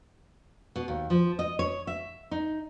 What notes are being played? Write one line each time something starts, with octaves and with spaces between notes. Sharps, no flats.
B2
D#2
F3
D#5
C#5
E5
D#4